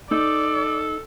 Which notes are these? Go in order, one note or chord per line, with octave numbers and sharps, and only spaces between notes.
D#4 A4 D5